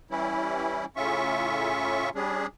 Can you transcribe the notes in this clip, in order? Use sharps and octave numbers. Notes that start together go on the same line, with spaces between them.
E3 G3 C#4 E4
A2 C#3 C#4 F4 E5 C#6
G3 C#4 D4 G#4